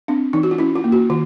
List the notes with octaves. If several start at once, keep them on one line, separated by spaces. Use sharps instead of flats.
C4 D4
E3 D#4
F#4
F4
C#4 E4
F4
A#3
F#4
D#3 F4